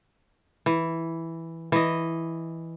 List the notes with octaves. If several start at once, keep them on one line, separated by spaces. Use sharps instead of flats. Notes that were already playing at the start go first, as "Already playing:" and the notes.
E3
E3 D#5